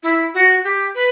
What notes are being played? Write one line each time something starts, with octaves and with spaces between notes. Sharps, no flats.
E4
F#4
G4
B4